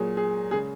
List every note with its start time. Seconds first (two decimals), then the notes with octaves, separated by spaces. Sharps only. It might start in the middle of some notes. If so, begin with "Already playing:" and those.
Already playing: A#2 F#3 G#4
0.17 G#4
0.51 C#3 G#3 G#4